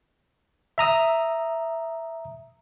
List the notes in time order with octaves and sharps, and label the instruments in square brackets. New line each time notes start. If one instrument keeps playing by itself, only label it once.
[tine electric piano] E5 A#5 D#6 E6